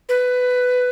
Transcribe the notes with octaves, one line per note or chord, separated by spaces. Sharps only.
B4